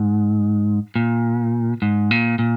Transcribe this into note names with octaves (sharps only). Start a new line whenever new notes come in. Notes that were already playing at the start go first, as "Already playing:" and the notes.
Already playing: G#2
A#2
G#2
A#2
A#2